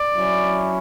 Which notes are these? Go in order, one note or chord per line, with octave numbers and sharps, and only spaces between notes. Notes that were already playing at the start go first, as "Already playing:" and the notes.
Already playing: D5
F#3 C#4 E4